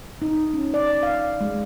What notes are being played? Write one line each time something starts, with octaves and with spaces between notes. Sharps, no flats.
D#4
C#4
D5
F5
G#3